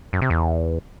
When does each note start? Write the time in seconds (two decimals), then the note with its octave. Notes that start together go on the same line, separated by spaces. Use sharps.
0.13 F#2
0.22 C3
0.30 E2